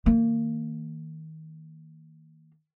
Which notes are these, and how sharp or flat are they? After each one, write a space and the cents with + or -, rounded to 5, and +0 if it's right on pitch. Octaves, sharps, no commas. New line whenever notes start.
D#3 +25 A#3 -25